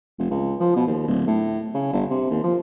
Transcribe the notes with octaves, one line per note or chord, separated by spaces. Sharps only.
F1
C#2
F3
B2
D#2
D1
A2
C#3
G1
C3
D#2
F3